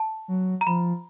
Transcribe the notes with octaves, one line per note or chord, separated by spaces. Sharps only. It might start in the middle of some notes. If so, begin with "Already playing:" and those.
Already playing: A5
F#3
A#5
F3 B5